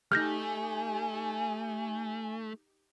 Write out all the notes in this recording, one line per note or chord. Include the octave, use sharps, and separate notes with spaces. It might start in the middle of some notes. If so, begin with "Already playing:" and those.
A3 D#4 G4 G#5 F6 G6 A#6